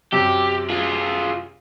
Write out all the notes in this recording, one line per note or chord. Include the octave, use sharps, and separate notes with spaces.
F#2 C3 G4
F4 G#4